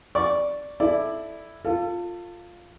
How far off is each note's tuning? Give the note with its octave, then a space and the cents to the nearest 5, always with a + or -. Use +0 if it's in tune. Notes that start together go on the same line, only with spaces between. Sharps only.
D5 -5 C#6 +0
E4 +0 A4 -20 D5 +10
F4 +0 A4 +30